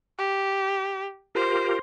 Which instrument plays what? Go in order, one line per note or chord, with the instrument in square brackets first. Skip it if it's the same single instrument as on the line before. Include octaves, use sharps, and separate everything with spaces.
[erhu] G4
[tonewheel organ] F4 G4 A#4 [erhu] C5